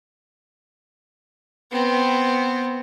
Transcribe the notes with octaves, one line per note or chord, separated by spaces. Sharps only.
B3 C4